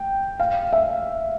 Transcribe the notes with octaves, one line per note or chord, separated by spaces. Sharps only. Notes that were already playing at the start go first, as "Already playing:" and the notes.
Already playing: G5
F5
E5